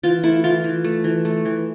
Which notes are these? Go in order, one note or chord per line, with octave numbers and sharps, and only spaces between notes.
E3 F4
A3 E4
E3 F4
E3
A3
E3
A3
E3